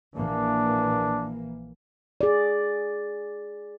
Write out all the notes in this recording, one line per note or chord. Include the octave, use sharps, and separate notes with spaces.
A#1 E3 A#3 D4
G#4 D5